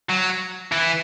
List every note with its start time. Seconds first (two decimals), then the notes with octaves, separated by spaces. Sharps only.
0.09 F#3
0.72 E3